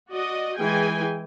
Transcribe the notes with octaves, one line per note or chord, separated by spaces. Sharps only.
F#4 D5 D#5
E3 G#3 G#4 G5 G#5